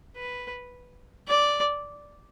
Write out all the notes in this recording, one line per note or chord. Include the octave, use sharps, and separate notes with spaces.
B4
D5